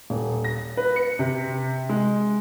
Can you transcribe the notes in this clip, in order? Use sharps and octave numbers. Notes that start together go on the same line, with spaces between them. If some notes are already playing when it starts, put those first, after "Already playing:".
D#1
A#6
B4
C#7
C3
G#3